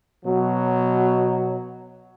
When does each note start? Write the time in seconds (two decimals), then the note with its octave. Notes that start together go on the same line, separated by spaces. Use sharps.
0.24 B2 F#3